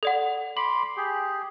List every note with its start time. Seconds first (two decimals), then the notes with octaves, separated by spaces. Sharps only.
0.03 A4 D5 F#5
0.57 B5 C6 D6 F#7
0.97 G4 G#4